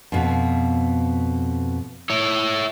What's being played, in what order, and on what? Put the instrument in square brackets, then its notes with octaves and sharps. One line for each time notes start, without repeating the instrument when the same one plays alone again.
[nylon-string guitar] F2 B2
[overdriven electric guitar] E4 C#5